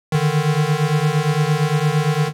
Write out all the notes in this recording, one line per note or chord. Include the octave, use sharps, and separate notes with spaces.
D3 D#3